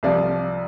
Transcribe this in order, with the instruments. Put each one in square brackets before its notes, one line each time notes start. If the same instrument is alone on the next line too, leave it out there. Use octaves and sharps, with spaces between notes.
[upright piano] C2 C3 F3 D5